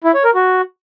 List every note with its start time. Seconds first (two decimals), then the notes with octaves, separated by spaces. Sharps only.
0.04 E4
0.14 C#5
0.24 A#4
0.34 F#4